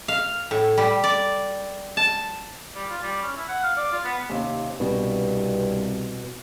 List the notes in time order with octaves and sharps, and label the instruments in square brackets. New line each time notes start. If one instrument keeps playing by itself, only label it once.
[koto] F5
A2
G3
D5
A5
[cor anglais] G3
F4
G3
C#4
E4
F#5
F5
D5
F4
B3
[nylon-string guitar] D#2 C3 C#4
[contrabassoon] C2 [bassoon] G2 [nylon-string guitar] B2